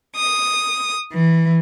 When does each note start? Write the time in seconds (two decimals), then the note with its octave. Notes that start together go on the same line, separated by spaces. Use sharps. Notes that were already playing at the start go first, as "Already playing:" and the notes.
0.16 D#6
1.11 E3